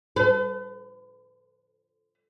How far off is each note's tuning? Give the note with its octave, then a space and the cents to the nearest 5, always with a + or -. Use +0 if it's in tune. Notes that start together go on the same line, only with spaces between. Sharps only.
B4 +40